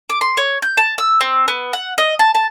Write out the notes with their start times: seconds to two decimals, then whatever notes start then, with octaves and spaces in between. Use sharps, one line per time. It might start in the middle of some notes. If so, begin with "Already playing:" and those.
0.10 D6
0.21 C6
0.37 C#5
0.62 G6
0.77 A5
0.98 E6
1.21 C4
1.48 B3
1.73 F#5
1.98 D#5
2.19 A5
2.35 A5